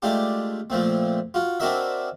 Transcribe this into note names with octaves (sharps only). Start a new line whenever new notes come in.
G#3 A3 D4 F4 G4
A#2 F3 A3 C4
F4 F#4
C4 D4 F#4 A#4 D#5 E5